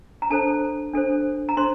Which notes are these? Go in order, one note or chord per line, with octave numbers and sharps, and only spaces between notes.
A#5
D4 A4 C5 A5
D4 A4 C5
A#5
D4 A4 C5 C6